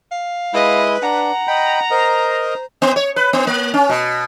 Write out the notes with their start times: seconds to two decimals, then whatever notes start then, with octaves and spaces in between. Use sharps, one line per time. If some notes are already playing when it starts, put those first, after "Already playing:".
0.11 F5
0.54 G#3 E4 B4 D#5
1.02 D4 F#5 A#5
1.47 D#5 G5 B5
1.91 A#4 C5 D#5
2.82 B3
2.96 C#5
3.16 B4
3.33 B3
3.47 A#3
3.74 C#4
3.89 B2